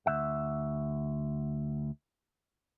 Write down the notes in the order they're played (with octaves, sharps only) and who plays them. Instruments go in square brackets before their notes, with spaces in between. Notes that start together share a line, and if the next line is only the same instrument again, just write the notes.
[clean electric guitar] D2 E5 F#5